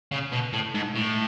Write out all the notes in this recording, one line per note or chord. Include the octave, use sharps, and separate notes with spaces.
C#3
B2
A2
G#2
A2